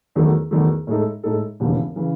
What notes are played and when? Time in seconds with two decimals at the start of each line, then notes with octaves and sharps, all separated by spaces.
0.15 E2 D#3 F#3 A3
0.51 E2 D#3 F#3 A3
0.87 A2 G#3 D#4 A4
1.23 A2 G#3 D#4 A4
1.60 E1 D#2 C#3 E3
1.96 C#3 E3